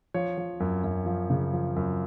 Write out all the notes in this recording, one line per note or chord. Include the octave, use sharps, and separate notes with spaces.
F3 C#5
F3
F#2
F#2
F3
C#3
F3
F#2